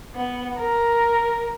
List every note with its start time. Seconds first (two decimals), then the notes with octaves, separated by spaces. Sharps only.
0.15 B3
0.58 A#4